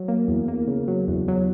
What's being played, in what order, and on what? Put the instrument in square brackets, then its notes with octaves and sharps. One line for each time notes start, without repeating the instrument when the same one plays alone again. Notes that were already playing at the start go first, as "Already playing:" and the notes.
Already playing: [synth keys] F#3
A#3
E2
A#3
C#3
F#3
E2
F#3